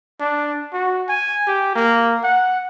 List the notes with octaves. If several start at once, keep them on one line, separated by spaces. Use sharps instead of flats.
D4
F#4
G#5
G4
A#3
F#5